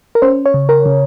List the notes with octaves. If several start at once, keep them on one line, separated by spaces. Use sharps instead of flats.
A#4
C#4 C5
C#5
C#3
A#4
C#3